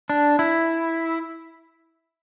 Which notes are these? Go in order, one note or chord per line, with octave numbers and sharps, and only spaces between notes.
D4
E4